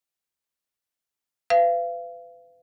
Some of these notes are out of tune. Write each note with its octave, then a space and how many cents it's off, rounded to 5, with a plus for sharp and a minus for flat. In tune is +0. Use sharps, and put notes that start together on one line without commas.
B4 +35 F5 -35